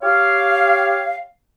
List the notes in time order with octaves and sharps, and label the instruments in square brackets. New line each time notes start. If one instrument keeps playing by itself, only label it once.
[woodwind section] G4 C#5 F5